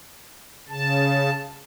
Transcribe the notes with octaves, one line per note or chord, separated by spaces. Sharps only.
C#3 A5